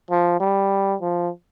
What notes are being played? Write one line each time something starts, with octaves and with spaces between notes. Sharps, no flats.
F3
G3
F3